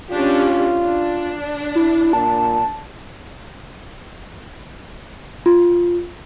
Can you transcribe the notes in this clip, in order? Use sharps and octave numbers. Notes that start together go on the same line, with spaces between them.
C#4 D4 F4 G4
D4
E4
A#2 A5
F4